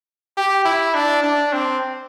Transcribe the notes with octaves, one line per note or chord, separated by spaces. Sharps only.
G4
E4
D4
D4
C4